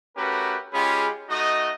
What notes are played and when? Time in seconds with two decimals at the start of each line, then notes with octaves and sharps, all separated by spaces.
0.16 A3 C#4 F#4 G4 A#4 B4
0.74 G#3 C#4 F4 G4 G#4 B5
1.30 A3 D#4 F#4 D#5